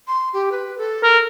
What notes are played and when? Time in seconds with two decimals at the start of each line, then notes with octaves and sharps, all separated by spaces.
0.08 C6
0.33 G4
0.52 B4
0.78 A4
1.03 A#4